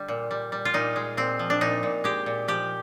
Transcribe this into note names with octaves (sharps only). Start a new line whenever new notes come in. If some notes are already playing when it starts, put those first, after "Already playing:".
Already playing: D3 G3
A#2
G3
G3
F4
A#2 D#4
G#3
A#2 C4
F3
D4
A#2 D#4
A#2
G#3 G4
A#2
F3 G4